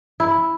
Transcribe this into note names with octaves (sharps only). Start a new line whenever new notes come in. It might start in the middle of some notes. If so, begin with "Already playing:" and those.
E4